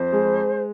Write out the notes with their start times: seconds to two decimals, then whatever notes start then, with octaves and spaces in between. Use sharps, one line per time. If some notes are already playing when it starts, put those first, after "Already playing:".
Already playing: F2 C5
0.12 G#3